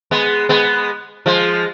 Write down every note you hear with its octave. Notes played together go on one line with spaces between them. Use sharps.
G#3 B3
G#3 B3
F3 G#3